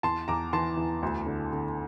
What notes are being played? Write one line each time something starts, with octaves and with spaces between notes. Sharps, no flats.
E2 A5 C6
E2 A#5 D6
E3 A5 C6
E2
D2
D3
D3